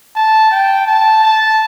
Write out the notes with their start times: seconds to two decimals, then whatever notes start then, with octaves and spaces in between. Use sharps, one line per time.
0.16 A5
0.51 G5
0.87 A5
1.23 A5